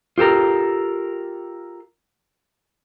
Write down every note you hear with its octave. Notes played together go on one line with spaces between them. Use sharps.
F4 G4 A4 A#4